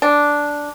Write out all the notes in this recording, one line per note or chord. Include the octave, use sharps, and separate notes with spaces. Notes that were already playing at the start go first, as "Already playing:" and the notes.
D4